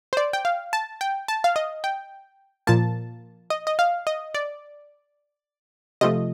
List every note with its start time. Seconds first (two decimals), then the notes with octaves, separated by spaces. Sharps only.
0.13 C5
0.17 D5
0.33 G5
0.45 F5
0.73 A5
1.01 G5
1.28 A5
1.44 F5
1.56 D#5
1.84 G5
2.67 A#2 F3 A#3 A5
3.50 D#5
3.67 D#5
3.79 F5
4.07 D#5
4.34 D5
6.01 C3 F3 A3 D#5